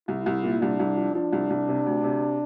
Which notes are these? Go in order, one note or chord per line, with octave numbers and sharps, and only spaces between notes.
C2 E4
C2
A#2
C2 D4
C2
F3
F3 D4
C2
C2
C3
D2
C3